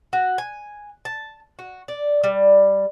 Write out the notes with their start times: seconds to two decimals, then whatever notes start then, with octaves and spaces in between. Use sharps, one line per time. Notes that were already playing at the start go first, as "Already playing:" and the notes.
0.13 F#4
0.38 G#5
1.05 A5
1.59 F#4
1.88 D5
2.24 G3